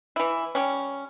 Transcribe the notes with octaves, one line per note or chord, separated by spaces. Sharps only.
E3 E4
G3 C#4